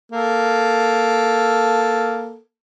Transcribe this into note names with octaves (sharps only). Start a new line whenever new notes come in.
A#3 A4